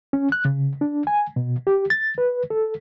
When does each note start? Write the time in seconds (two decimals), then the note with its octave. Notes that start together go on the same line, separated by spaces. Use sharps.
0.13 C#4
0.32 F#6
0.45 C#3
0.81 D4
1.07 G#5
1.36 B2
1.67 G4
1.90 A6
2.18 B4
2.50 A4